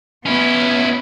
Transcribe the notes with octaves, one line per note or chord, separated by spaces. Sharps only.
B3 C#4 E4